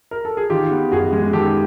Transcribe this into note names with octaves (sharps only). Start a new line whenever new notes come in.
A#4
A4
G#4
D#3 F4 G4
B3
F#2 F#4 G#4
G#3
D#3 G4 A4